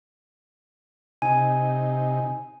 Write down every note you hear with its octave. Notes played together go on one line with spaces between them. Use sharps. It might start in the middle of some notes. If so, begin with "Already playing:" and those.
C3 D#4 G#5